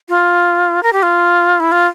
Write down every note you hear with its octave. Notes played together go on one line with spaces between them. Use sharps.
F4
A#4
G4
F4
E4
F4